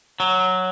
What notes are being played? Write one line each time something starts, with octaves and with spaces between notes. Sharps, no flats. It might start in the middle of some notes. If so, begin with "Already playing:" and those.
F#3